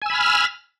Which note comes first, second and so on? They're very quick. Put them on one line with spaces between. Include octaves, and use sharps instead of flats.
G#5 E6 B5 F6